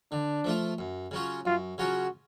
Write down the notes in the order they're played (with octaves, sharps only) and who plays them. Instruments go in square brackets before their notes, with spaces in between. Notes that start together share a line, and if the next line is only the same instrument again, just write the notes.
[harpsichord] D3 [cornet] D4
[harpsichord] F3 A3 F4
F#2
C#3 F#3 C#4 F4
[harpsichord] F#2 [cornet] F4
[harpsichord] C#3 F#3 C#4 F4 [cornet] F#4